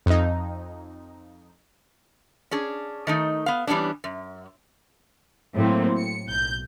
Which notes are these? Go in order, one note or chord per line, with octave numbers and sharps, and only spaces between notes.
F2 D#4
C#4 D4 G#4
D#3 A3 D#4
B3 F5
E3 G3 B3 C#4 D4
F#2
A2 F#3 A#3 C4
C#7
B1 G6